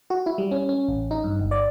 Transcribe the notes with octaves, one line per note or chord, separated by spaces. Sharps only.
F#4
E4
G3
C#4
C#4
A1
D#4
G2
G1
D5